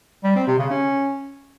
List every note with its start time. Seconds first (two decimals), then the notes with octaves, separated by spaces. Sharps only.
0.24 G3
0.35 C4
0.47 C3
0.59 C#3
0.70 C#4